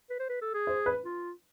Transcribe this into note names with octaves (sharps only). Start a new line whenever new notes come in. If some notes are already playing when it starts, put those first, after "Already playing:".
B4
C5
B4
A4
G#4
C5
B4
F4